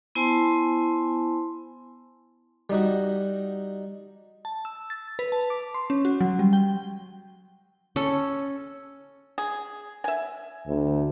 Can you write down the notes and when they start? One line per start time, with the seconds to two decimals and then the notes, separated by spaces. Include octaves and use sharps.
0.15 B3 E4 C5 G#5 A5 C6
2.70 G3 D#4 F#4
4.45 A5
4.65 E6
4.90 A6
5.19 B4
5.32 A5
5.50 D6
5.75 C6
5.90 C#4
6.05 F#4
6.21 F#3
6.39 G3
6.53 G5
7.96 C#4 A4
9.38 G#4
10.04 E5 G#5
10.67 D2